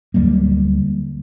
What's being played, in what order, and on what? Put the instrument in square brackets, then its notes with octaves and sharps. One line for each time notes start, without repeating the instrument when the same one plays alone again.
[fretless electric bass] D2 F#3 G3 A#3